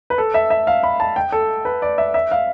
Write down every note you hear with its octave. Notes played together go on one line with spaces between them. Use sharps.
B4
A4
E5
E5
F5
B5
A5
G5
A4
B4
D5
E5
E5
F5